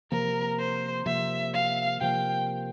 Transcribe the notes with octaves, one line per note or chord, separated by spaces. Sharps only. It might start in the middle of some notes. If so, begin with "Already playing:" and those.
C3 F3 A#3 A#4
C5
C3 F3 A#3 E5
F5
C3 F3 A#3 G5